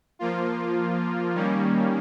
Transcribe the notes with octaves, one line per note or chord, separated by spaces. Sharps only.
F3 A#3 F4
D#3 G3 A#3 C#4